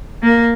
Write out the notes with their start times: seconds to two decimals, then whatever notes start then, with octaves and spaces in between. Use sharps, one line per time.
0.22 A#3